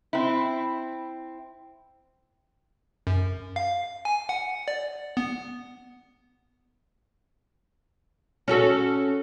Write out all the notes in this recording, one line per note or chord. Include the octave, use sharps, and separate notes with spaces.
C4 E4
F#2
F5
G#5
F#5
D5
B3
C#4 F#4 A4